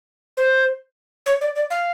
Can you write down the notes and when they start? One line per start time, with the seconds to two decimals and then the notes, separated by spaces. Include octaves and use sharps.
0.37 C5
1.26 C#5
1.41 D5
1.56 D5
1.70 F5